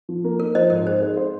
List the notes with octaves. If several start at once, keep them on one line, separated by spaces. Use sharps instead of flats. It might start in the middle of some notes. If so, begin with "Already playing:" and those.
F3
A#3
D#4 A#4
F3 C5 D#5
G#2 A#4
G#4 C5
C5
C5